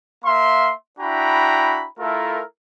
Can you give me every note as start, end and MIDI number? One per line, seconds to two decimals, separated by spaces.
0.25 0.73 58
0.25 0.73 76
0.25 0.73 77
0.25 0.73 84
0.99 1.86 62
0.99 1.86 64
0.99 1.86 66
0.99 1.86 79
0.99 1.86 82
0.99 1.86 83
2.00 2.43 57
2.00 2.43 64
2.00 2.43 65
2.00 2.43 69
2.00 2.43 70